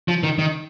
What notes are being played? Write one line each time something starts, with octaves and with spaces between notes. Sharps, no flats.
F3
D#3
D#3